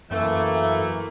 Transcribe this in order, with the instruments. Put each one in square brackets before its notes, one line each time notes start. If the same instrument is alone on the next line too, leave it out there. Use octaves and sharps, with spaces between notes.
[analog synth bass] F#2 [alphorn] E3 [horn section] A3 [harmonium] A#3